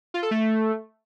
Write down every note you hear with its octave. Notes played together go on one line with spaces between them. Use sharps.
F4
A4
A3